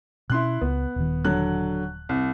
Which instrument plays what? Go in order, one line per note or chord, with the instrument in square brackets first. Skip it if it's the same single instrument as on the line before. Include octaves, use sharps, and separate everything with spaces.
[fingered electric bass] B2 C#4 [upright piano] E4 C6 F#6
[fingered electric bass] C#2 [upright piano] B3
[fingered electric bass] D#1 D#3
[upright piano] D3 F#3 F#6
C2